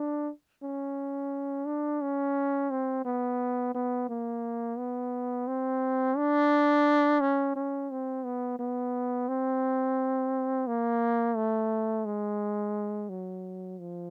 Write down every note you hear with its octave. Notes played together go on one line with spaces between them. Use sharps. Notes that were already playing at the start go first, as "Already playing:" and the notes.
Already playing: D4
C#4
D4
C#4
C4
B3
B3
A#3
B3
C4
D4
C#4
C#4
C4
B3
B3
C4
A#3
A3
G#3
F#3
F3